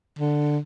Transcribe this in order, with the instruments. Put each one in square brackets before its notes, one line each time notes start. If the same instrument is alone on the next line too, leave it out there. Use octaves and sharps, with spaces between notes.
[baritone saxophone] D3